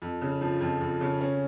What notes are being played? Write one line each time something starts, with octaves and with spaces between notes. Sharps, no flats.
F2
C#3
F3
F2
F2
C#3
C#4